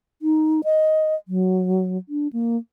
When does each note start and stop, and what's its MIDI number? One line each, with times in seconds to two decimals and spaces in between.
0.22 0.61 63
0.64 1.15 75
1.28 1.97 54
2.09 2.28 62
2.33 2.57 58